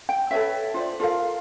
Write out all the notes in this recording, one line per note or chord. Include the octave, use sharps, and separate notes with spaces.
G5
A4 B4 C#5 E5
F4 C5 D5
F4 A4 A#4 F5